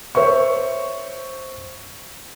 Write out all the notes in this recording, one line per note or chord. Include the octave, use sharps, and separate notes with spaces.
C5 C#5 E5 C#6